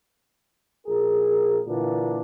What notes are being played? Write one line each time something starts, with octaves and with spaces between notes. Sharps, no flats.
A#1 G#4 A#4
A#2 D3 E3 D4